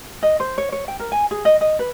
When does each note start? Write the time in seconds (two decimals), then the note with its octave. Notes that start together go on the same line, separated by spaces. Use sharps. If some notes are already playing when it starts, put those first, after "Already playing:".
0.23 D#5
0.40 C5
0.58 C#5
0.72 C#5
0.88 G5
0.99 A#4
1.12 G#5
1.31 G#4
1.45 D#5
1.61 D#5
1.79 B4